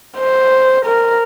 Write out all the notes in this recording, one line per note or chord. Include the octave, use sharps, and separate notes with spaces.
C5
A#4